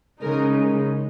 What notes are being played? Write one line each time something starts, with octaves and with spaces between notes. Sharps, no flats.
C#3 G#3 D#4 A#4